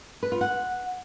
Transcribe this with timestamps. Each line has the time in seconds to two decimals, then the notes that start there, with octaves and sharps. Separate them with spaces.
0.23 B4
0.32 F4
0.41 F#5